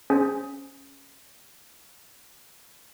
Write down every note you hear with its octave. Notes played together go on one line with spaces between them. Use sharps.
C#4 G#4 C5 G#5